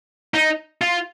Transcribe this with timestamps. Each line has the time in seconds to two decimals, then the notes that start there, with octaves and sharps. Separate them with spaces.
0.34 D#4
0.81 F4